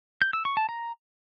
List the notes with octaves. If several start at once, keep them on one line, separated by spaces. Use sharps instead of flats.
G6
E6
C#6
A5
A#5